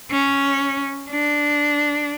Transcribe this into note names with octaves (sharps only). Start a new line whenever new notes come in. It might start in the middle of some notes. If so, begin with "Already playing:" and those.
C#4
D4